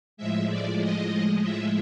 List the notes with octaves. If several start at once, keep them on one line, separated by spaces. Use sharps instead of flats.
A2 F3 G#3 E5
D5
D#5
E5